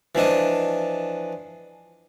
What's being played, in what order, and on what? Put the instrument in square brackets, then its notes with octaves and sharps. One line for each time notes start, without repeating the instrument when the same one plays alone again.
[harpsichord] E3 F3 D4 D#5